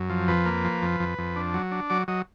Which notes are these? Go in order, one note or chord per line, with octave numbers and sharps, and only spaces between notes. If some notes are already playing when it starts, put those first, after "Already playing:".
Already playing: F#2
F3
F2 B4
A#3
F3
F2
F2
F2
D4
F#3
D4
F#3 D5
F#3 D#5